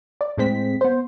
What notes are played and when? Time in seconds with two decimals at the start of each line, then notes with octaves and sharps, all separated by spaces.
0.21 D5
0.38 A2 G#3 C4 B6
0.81 B3 C5